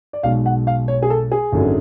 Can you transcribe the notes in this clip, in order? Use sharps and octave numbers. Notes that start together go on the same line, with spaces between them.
D5
B1 B2 G#3 F5
F#5
F5
C#5
G#4
A4
G#4
G#1 F#2 D3 F#3